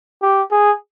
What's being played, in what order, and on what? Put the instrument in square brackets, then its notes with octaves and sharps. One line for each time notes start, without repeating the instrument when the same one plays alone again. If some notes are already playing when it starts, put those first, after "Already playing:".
[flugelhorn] G4
G#4